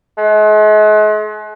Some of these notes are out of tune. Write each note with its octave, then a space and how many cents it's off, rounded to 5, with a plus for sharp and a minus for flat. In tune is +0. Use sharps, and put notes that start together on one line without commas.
G#3 +40